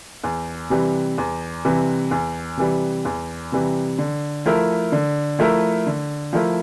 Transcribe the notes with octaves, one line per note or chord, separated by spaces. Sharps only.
E2
C3 E3 G3
E2
C3 E3 G3
E2
C3 E3 G3
E2
C3 E3 G3
D3
F3 A3 E4 A#4
D3
F3 A3 E4 A#4
D3
F3 A3 E4 A#4